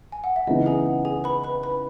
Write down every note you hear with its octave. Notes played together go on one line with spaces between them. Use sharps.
G#5
F#5
E5
C#2 C#3 E3 B3 D#4 D#5
G#4 G#5
F#5
G#4 G#5
B4 B5
B4 B5
B4 B5